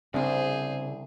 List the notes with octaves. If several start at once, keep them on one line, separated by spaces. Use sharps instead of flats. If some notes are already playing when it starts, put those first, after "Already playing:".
C2 C#3 C4 D4 G#4 C5